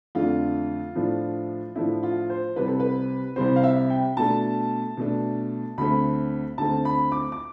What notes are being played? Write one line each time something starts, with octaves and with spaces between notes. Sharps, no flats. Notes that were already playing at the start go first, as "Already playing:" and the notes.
F2 D3 A3 D4 F4
A2 F3 A3 D4
A2 F3 A3 D4 E4
F4
C5
C2 C3 G3 C4 B4
A4
B4
C2 C3 G3 C4 C5
F5
E5
G5
B2 A3 D4 A5
B2 A3 D4
D2 D3 A3 C4 B5
D2 D3 A3 C4 A5
B5
D6
D6